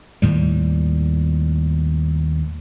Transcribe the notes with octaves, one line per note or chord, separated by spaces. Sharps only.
D#2 A2 G3